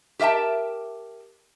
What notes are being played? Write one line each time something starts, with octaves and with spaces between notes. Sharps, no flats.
G4 A#4 E5 G5 A5